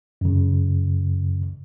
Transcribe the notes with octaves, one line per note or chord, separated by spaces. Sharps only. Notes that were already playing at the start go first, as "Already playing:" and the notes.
F#2 C#3